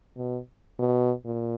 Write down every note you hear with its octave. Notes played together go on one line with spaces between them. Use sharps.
B2
B2
A#2